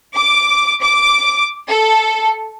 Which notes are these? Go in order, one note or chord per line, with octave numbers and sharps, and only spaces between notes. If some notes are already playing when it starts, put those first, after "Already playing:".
D6
D6
A4